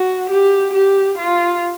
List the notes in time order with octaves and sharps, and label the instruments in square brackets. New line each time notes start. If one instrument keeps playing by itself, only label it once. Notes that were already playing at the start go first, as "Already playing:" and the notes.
Already playing: [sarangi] F#4
G4
G4
F4